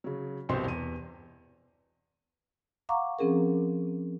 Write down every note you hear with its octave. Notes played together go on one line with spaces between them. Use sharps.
C#3 F#3
C2 B2 C4 C5 C6
E2 D#7
F5 F#5 A#5 C#6 D6
F3 C4 C#4 G#4 A#4